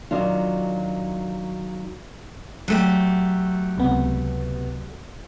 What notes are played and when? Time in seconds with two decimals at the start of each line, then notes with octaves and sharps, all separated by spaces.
0.11 D#3 F#3 D4 F4
2.68 F#3 A3 G4
3.78 C#2 C3 B3